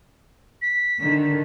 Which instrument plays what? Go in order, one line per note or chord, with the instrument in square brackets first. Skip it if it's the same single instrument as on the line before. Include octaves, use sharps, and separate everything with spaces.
[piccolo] B6
[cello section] D3 D#3